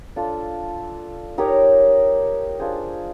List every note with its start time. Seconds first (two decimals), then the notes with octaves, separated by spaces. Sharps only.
0.16 D4 F4 A4
1.38 D#4 G4 A#4 C#5
2.59 D4 F4 G#4 C5